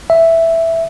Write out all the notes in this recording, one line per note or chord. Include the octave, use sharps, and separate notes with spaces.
E5